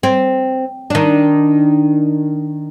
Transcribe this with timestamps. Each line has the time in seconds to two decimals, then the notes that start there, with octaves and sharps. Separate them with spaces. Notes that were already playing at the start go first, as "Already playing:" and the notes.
0.03 C4
0.90 D#3 D4